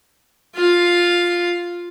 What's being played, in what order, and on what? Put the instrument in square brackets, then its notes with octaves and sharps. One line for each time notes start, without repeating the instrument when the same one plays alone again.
[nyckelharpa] F4 F5